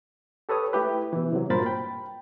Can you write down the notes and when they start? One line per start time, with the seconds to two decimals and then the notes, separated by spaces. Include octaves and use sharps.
0.49 G4 A4 B4 C#5 D#6
0.73 A3 E4 G4 B4
1.13 B2 E3
1.32 C3 F#3
1.50 G2 A#2 A#4 C5 B5 A6
1.66 G5 B5